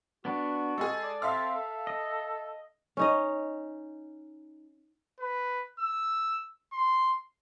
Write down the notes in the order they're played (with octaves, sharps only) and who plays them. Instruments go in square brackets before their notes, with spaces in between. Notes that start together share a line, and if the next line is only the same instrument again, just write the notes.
[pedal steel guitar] B3 D4 [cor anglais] F#4
[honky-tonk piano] G#3 G#4 [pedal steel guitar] A4
[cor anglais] D5
[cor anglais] C4 [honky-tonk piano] E5 F5 F6
[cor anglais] A4
[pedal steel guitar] D#5
[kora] C#4 D#4 D#5
[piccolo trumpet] B4
E6
C6